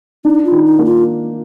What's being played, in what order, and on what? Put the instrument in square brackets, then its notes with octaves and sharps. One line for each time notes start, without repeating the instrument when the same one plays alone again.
[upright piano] D4 [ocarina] D#4
[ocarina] F4
[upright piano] D#3
[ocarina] D#4
[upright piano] A#3
[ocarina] F4